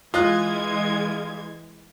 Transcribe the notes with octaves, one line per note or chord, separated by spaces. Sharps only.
E3 G#3 F4 D#5 F#6 G#6